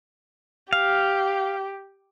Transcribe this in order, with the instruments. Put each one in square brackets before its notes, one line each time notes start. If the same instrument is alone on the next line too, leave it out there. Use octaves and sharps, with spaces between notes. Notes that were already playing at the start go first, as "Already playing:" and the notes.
[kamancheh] G4 [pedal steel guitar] F5